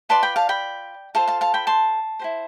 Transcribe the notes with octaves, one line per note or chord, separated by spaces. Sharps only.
F4 B4 D5 A5 C6
G5 B5
F5 A5
G5 B5
F4 A4 C5 F5 A5
F5 A5
F5 A5
G5 B5
A5 C6
E4 G4 C5